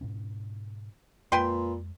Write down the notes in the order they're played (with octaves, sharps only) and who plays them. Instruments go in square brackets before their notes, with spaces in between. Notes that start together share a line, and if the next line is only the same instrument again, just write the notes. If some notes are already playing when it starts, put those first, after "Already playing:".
[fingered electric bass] G#2 B2 C#4
[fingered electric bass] F2 G#3 [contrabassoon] A#2 [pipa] B4 G5 C6